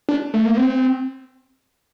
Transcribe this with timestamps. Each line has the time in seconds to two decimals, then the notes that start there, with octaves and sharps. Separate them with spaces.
0.09 D4
0.34 A3
0.46 A#3
0.57 C4